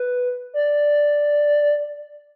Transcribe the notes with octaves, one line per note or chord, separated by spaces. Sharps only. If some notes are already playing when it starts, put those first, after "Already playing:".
Already playing: B4
D5